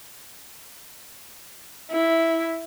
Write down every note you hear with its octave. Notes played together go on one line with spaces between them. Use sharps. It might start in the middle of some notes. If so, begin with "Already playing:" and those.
E4